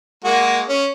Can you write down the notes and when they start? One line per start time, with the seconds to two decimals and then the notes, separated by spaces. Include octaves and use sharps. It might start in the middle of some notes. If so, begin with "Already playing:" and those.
0.24 G#3 A#3 F#4
0.69 C#4